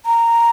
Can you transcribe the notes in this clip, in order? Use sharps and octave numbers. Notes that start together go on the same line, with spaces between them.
A#5